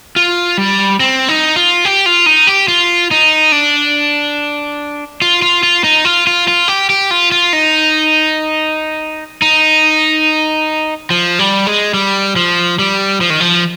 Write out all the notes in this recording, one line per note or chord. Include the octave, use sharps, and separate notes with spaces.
F4
G3
C4
D#4
F4
G4
F4
D#4
G4
F4
D#4
D4
F4
F4
F4
D#4
F4
F4
F4
G4
G4
F4
F4
D#4
D#4
F3
G3
G#3
G3
F3
G3
F3
D#3
F3